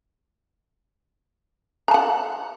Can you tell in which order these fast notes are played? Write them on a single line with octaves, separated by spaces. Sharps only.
A#5 A5 F#5